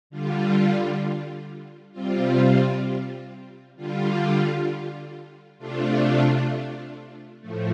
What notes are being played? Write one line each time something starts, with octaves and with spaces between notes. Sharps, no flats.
D3 G3 F4
C3 G3 C4 F4
D3 G3 F4
C3 A3 D4 F4
A2 F3 A3